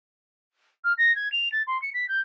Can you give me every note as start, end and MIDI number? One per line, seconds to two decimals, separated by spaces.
0.84 0.93 89
0.98 1.14 94
1.15 1.31 92
1.32 1.51 101
1.52 1.62 93
1.67 1.80 84
1.82 1.90 97
1.94 2.08 95
2.08 2.20 91